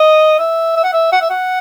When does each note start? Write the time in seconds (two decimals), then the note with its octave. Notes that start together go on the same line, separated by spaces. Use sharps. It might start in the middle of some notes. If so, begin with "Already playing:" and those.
Already playing: D#5
0.39 E5
0.76 E5
0.84 F#5
0.93 E5
1.12 F#5
1.21 E5
1.30 F#5